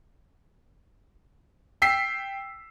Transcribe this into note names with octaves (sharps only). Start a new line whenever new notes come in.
G5 E6 B6 C7